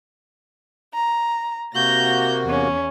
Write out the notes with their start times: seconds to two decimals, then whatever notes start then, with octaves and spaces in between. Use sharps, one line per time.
0.93 A#5
1.75 C3 A#3 F#4 A#5 G6 A#6
2.45 E2 C#4